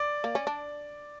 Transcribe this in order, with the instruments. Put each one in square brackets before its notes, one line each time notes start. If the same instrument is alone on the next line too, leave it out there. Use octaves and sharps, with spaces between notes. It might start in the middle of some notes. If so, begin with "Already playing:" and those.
Already playing: [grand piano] D5 D6
[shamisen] A#3
C#4
D4